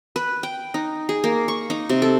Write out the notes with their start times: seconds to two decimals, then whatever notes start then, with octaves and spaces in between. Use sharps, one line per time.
0.16 B4
0.43 G5
0.74 D#4
1.09 G#4
1.24 A#3
1.48 C#6
1.70 D#4
1.89 C3
2.02 A4